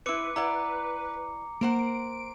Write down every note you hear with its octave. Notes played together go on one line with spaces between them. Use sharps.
C4 E4 B4 D6 C#7
E4 D5 F#5 A#5
A#3 A#4 C5 F#5 D7